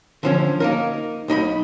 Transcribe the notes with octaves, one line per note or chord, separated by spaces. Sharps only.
D3 F3 C#4
A#3 D#4 A#4
B1 D#4 A#5 B5